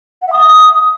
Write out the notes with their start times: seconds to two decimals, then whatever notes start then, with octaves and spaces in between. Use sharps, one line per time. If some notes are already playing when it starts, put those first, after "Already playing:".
0.22 F#5
0.27 E5
0.32 D#6